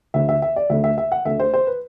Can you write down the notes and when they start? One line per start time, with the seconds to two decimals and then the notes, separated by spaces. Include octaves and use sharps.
0.14 D2 D3 A3 E5
0.29 E5
0.42 E5
0.56 D5
0.70 D2 D3 A3 E5
0.84 E5
0.98 E5
1.12 F#5
1.25 D2 D3 A3 E5
1.40 C5
1.54 C5
1.67 B4